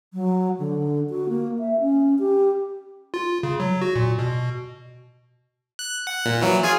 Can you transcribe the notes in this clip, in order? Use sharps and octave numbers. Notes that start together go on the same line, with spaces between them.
F#3
D3
F#4
A#3
E5
C#4
G4
F4
C#3
F#3
F#4
A#2
B2
F#6
F#5
A#2
E3 F#3
F4 G#4 G#5